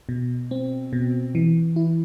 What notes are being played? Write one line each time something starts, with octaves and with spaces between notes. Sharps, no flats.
B2
C4
B2
E3
E4